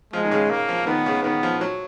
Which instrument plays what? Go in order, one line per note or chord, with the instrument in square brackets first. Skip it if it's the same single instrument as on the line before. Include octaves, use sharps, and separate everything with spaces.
[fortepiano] F3 [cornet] G#3
[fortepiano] D#3
C#3
[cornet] A#3
[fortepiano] F3
[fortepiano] D#3 [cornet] B3
[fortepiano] C#3
[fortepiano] D#3 [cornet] B3
[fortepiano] F3
F#3